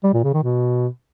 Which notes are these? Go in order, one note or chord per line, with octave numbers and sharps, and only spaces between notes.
G3
A#2
C#3
D#3
B2